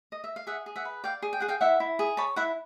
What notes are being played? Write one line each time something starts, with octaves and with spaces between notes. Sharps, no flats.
D#5
E5
F5
G#4 E5 F#5
G#4
E5 F#5
B4
D5 F5 G5
G#4
G5
G#4 F#5
F5 G5
E4 E5 F#5
E4
G#4
C#5 A5 B5
E4 E5 F#5